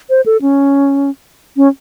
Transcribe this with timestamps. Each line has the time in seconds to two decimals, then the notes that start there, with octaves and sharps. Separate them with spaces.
0.10 C5
0.26 A4
0.42 C#4
1.57 C#4